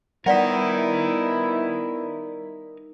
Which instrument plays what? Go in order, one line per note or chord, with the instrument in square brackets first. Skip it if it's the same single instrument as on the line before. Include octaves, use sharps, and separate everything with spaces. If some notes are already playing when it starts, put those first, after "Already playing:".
[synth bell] G3 D5 B6 [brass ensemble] B3 E4 [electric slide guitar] D#4 A#4 [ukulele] F#5